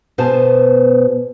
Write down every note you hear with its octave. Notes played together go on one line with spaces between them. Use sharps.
B2 B3 F#4 C5 G#5 A5